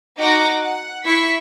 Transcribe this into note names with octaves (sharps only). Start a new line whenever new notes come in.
D#4 F#4 D6 A#6
F#5
E4 C#6 B6